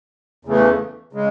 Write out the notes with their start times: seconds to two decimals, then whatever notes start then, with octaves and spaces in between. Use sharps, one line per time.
0.45 E2 C#3 E3 A3
1.13 C#3 G#3